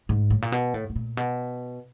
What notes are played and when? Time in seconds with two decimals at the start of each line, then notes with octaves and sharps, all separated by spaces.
0.09 G#2
0.30 A2
0.42 A#2
0.52 B2
0.74 A2
0.90 A2
0.96 A#2
1.17 B2